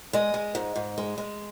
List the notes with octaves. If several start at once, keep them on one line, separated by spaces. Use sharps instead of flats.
G#3 D#5
G#3
G#2
G#2
G#3
G#3